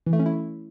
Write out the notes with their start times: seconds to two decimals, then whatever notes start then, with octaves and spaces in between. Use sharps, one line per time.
0.07 E3
0.13 A3
0.19 C#4
0.26 E4